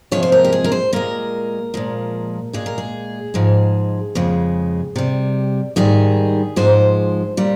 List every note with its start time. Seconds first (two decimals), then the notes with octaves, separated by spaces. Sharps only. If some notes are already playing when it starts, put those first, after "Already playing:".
0.12 C3 F3 G#3 C#5
0.23 C5
0.32 A#4
0.45 G4
0.52 G#4
0.64 A#4
0.72 C5
0.93 A#2 G#3 A#4
1.74 A#2 F3 G#3
2.53 A#2 G#3 G#4
2.66 A#4
2.78 G#4
3.34 G#2 F3 G#3
4.15 F2 C#3 G#3
4.96 C3 G3
5.76 G#2 D#3 G3 G#4
6.56 G#2 F3 G#3 C5
7.37 A#2 G3